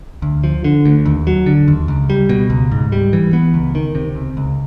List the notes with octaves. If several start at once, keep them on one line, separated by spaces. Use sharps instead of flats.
D2
F3
D3
D2
D#2
F#3
D3
D#2
C#2
G3
B2
C#2
G#2
G3
E3
B3
C#2
D#3
C3
C#2
C#2